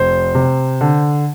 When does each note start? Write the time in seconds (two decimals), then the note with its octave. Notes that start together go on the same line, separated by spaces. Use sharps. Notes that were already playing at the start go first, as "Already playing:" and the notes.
Already playing: F1 C5
0.35 C3
0.81 D3